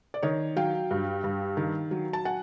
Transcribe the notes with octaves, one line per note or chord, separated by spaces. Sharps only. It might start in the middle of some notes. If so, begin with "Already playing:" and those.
D5
D#3 C#5 D#5
F#3 F5 G5
G2
G2
D#3
F#3
A5
F#5 G#5